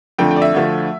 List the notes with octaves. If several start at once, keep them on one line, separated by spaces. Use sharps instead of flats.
F2 D3 A3 G5
G5
D5
E5
D2 D3 F3 A3